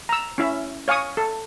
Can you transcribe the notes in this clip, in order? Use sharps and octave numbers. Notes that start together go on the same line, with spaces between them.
A#5 E6
C#4 E4 E5
C#5 F5 G#5 C#6 D#6
A4